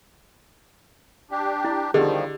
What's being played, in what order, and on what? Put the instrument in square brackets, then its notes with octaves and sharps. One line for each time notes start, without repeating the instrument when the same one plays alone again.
[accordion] D4 G4
[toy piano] E4
[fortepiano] D3 [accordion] D#3 F3 G3 [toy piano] G4 G#4 D#5